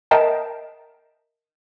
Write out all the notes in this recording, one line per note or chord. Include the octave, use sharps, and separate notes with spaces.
A#4 D#5 E5 G5 A5 A#5